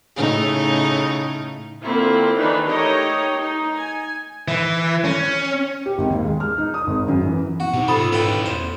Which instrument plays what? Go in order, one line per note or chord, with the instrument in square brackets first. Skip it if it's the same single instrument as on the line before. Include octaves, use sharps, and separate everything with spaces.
[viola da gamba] A2 C#3 D#4
[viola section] D3 A#3 C4 E4 F4
D#3 E3 D4 D#4 B4
A3 D#4 G4 A#4 C#5 D#5
D#4
G#5
[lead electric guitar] E3
C#4
[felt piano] G4
G#1
D#2
G#3
F6
D#4
D#6
G#1
F#2
E3
[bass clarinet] B3 [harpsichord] F#4
[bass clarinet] G#2 [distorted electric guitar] C3
[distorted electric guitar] F4 E5 [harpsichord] A4 [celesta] B5 D#6
[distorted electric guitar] C#4 E4 [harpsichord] A4 B4 G5
[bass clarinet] E2 [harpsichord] C5